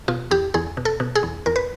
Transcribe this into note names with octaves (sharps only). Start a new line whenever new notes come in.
B2 F4
E2 G4
E2 G#4
B2
A4
B2
G#4
E2
E2 A#4
B4